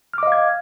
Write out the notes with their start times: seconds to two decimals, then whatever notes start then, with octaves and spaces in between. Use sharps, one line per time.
0.14 F6
0.18 D6
0.23 D#5
0.27 F5
0.32 G#6